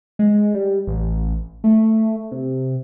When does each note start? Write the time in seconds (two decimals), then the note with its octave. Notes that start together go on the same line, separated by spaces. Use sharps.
0.19 G#3
0.54 G3
0.87 A1
1.64 A3
2.32 C3